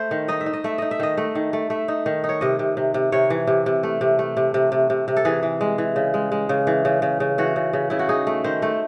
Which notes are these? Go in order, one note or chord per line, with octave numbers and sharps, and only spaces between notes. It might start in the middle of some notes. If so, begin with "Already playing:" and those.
Already playing: A3 A4 C5
D#3
D#4 D#5
E5
D#4
D#5
A3 E5
D#4 D#5
E5
D#3 D#5
A3
D#3
A3
A3 E5
D#4
D#3
D#4
C#5
C3 D#5
C3
C3
C3
C3 C#5
E3
C3
C3
A3
C3
A3
C3
C3
C3
C3
C3
A4
E3 G#4
E3
G#3
E3
C#3
G#3
G#3
C#3
E3
C#3
C#3
C#3
E3 F#4
C#3
C#3
C#3 E4
F#4
D#4 G#4
A3
D#3 C5
A3